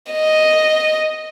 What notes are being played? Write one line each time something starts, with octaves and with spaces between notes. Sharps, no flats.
D#5